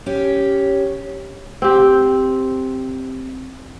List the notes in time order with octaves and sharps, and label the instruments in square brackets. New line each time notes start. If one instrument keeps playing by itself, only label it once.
[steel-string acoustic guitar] C#4 G4
[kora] C4 G4